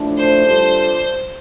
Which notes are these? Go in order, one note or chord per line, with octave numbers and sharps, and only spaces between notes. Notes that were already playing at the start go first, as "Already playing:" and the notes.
Already playing: A2 F3 A3 D4
C5
G3 D4 F4 A4